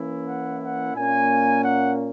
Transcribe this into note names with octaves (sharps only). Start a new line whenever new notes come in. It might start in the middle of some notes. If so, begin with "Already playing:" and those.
Already playing: E3 A#3 C#4 E4
F#5
F#5
A#2 A#3 C#4 G#5
F#5